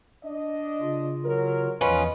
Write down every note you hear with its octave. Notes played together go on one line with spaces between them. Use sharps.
D4 D#5
C#3 F4
F#3 A#4
E2 E3 F3 C#4 F4 B4 D#5